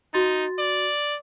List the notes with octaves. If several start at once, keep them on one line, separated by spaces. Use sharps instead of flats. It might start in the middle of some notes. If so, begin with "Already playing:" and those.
D#4 F#4 C6 A6
D5